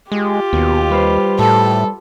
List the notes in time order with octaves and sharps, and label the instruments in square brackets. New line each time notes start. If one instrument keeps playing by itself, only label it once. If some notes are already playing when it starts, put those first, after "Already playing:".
[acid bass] G#3 [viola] F4 G4
[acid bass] D#2 [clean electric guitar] B2
[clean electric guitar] G3 B4 C5
[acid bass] A2 [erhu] A4